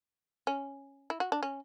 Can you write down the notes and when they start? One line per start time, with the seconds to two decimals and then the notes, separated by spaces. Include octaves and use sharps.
0.47 C#4
1.10 E4
1.20 F#4
1.32 D4
1.43 C#4